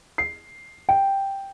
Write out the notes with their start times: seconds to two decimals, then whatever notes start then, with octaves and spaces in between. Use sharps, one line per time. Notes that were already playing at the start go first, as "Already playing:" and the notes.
0.18 C7
0.89 G5